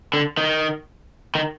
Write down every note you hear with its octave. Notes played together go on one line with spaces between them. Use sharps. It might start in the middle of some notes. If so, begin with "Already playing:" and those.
D3
D#3
D#3